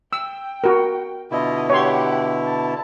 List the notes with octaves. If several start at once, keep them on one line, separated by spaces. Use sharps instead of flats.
G5 E6
F#4 A#4
B2 D3 E4 F4 D#5
G4 C#5 F#5 C6
A5